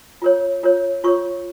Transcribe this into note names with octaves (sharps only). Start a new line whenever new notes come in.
F4 A#4 C#5
F4 A#4 C#5
F4 A#4 C#5 C#6